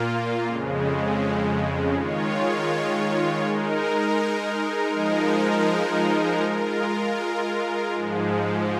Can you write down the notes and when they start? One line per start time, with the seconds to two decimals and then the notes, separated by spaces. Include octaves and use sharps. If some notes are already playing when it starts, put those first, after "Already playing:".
Already playing: A#2 A#3 F4
0.46 F2 C#3 G#3
1.95 D#3 G#3 F4 C#5
3.44 G#3 D#4 A#4
4.94 F3 G#3 D#4 A#4
6.42 G#3 F4 A#4
7.93 G#2 F3 G#3